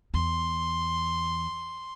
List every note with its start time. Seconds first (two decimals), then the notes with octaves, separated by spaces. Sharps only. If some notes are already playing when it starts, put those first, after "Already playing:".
0.14 E2 C6